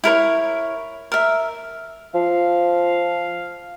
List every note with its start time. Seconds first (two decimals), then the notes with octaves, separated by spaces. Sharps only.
0.04 E4 A#4 C5 C#5
1.12 A#4 E5
2.15 F3 F5